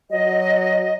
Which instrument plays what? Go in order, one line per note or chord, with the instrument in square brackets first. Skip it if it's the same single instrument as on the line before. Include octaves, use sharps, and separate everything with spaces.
[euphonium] F#3 [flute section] D#5